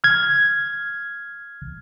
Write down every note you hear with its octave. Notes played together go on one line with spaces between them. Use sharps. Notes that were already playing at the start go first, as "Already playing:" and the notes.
F6 G#6